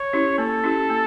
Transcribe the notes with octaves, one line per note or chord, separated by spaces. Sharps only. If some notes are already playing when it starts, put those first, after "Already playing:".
Already playing: C#5
C#4 E4 G4
A#3 A4
C#4 E4 G4
A#3